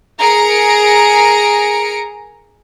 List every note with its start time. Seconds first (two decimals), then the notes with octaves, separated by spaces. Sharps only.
0.19 G#4 A#4 A#5 C#7 D7